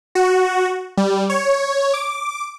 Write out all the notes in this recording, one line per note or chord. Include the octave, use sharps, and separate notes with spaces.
F#4
G3
C#5
D6